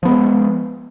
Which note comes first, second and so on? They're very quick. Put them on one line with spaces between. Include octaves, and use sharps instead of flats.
F3 B3 G#3